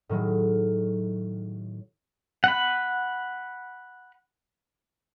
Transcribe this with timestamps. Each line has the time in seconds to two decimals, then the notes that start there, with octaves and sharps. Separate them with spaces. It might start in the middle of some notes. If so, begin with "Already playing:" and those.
0.09 A2 D#3 F#3 G#3
2.44 F#5 B5